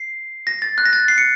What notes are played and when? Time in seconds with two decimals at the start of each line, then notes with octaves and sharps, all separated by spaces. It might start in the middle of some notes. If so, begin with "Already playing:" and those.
Already playing: C7
0.47 A#6
0.62 A6
0.78 F#6
0.86 A#6
0.93 A6
1.08 C7
1.18 C#7